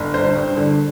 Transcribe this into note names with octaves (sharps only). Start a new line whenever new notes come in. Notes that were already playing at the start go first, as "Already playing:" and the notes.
Already playing: G1
D3 C5
G2
D3